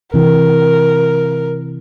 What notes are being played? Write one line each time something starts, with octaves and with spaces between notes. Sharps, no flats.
C3 E3 A#4